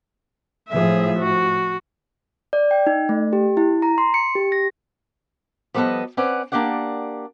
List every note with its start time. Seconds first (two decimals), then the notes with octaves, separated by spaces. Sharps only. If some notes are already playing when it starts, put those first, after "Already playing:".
0.69 A2 F3 G#4 E5
1.19 F#4
2.53 D5
2.71 G5
2.87 D#4
3.09 A3
3.33 G4
3.57 E4
3.82 A#5
3.98 C6
4.14 C#7
4.35 G4
4.52 A#6
5.74 F3 G3 B3 A4 B4 D#5
6.17 C4 C#4 B4 D5 F#5
6.52 A#3 D4 G4 D5 F#5